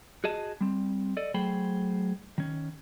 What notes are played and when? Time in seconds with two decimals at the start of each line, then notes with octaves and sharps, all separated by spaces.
0.24 F#4 G#4 D#5 A5
0.61 G3 C4
1.17 A4 D5 D#5
1.34 F#3 A3 G#4 C5 G5 B5
2.38 D#3 C#4